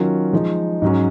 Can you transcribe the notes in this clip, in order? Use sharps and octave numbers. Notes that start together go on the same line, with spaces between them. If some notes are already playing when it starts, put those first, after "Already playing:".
Already playing: D#3 F#3 C#4 F4
F3 G#3 D#4
G#2 F#3 C#4